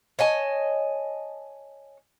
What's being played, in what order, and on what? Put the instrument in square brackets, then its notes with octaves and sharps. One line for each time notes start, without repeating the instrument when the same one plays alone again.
[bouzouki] C#5 D#5 G#5 A5